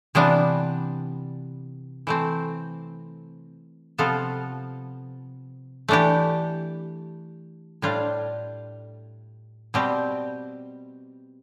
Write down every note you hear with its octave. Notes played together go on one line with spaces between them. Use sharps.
C3 E3 G3 B3 D4
E3 A3 C4
C3 F3 B3 F4 A4
E3 A3 D4 G4
A2 G3 D4 F4
B2 G3 C4 G4